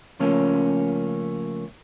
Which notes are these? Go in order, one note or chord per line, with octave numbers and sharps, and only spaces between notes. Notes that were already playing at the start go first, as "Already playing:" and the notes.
C#3 F3 A3 A#3 C#4